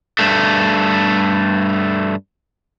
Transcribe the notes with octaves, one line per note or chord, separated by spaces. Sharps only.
G2 A3